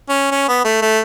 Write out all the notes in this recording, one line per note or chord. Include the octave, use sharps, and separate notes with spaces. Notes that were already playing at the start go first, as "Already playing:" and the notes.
C#4
C#4
B3
A3
A3